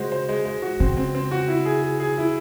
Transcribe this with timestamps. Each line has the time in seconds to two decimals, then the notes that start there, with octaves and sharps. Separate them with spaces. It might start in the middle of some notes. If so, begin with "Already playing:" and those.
Already playing: C#3 G#3 F#4 C5
0.12 C5
0.29 G#3
0.45 G#3
0.62 F#4
0.80 C#3 C4
0.97 C4
1.15 C4
1.31 F#4
1.48 E4
1.65 G#4
1.83 G#4
2.00 G#4
2.18 E4